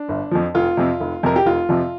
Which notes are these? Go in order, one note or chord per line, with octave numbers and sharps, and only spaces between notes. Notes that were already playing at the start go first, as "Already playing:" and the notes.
Already playing: D4
G1
F2 F3
F1 F4
F2 C3
F1
F2 C3 A#4
G4
F1 F4
F2 C3 F3